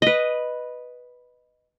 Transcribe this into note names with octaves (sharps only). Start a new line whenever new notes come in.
B4 D#5